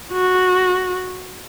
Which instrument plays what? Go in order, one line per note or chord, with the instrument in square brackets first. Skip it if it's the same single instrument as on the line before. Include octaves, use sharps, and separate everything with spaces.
[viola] F#4